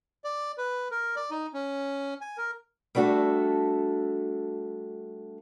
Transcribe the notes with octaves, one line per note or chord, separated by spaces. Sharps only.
D5
B4
A#4
D5
D#4
C#4
G#5
A#4
G3 A3 D4 F#4 A4